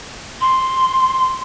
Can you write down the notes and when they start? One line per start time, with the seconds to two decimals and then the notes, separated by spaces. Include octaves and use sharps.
0.40 C6